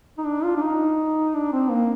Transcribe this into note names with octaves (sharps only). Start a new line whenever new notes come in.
D#4
D4
F4
D4
D#4
D4
C4
A#3